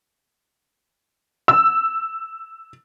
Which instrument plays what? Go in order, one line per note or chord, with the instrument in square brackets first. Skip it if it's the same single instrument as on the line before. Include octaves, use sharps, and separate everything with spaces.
[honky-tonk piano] E6